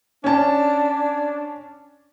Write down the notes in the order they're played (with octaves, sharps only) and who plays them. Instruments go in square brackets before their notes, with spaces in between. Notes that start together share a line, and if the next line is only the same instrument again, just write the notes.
[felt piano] C#4 A5 [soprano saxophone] D4